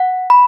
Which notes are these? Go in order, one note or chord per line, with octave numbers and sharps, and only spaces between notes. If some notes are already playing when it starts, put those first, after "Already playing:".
Already playing: F#5
B5